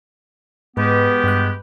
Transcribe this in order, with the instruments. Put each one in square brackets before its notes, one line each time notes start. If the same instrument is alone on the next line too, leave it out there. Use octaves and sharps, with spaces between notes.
[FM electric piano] G#2 [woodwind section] G#3 B3 G4 [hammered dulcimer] B4
[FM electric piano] G2 F#6